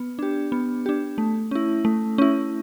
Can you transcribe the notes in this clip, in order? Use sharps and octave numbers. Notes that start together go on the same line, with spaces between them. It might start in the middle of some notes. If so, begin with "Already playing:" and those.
Already playing: B3
D4 G4
B3
D4 G4
A3
C#4 E4
A3
C#4 E4